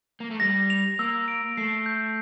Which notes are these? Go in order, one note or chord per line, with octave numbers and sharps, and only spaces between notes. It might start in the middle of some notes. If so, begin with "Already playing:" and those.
A#3
A3
G3 A#6
F7
A#3 E6
D7
A3 C7
G6